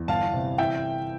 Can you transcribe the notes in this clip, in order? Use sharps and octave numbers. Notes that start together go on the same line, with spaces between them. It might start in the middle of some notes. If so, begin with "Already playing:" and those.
Already playing: E2
G1 F5 A5
C3
E3 E5 G5